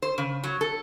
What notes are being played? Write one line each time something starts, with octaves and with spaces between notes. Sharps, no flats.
C5
C#3
F#3
A4